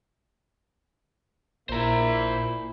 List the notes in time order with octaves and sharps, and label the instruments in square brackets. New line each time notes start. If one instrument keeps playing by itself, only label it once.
[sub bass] A#1 [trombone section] A#2 [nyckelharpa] A#3 E4 [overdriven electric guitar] C5 A#5